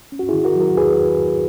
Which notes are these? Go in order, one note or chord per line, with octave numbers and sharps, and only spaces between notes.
C#4
F#4
E4 G#4
D#3
F#4 A#4
F#3
F#4 A#4
E2 G#4 B4